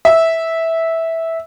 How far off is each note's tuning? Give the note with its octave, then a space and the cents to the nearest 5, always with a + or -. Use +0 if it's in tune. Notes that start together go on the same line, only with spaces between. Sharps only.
E5 -10